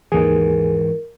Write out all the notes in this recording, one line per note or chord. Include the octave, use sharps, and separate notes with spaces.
D#2 G#2 E3 G#4 A#4